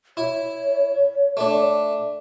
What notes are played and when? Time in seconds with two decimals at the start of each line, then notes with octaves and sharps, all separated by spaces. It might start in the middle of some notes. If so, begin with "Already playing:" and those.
0.17 E4 C#5
1.37 A3 D4